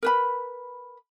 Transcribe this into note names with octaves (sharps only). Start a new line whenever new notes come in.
A#4 B4 B5